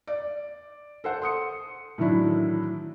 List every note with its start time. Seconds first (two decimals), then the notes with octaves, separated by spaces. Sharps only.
0.07 D5
1.04 A4 C5 F#5
1.22 C6 D#6 C#7
1.98 A2 D#3 E3 F#3 D4 E4